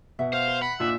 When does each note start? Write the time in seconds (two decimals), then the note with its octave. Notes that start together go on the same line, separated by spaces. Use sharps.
0.19 B2 E5 F#5
0.33 C5 F5
0.48 B4
0.62 F#5 B5
0.80 A#2 D4 D#4 F4 E5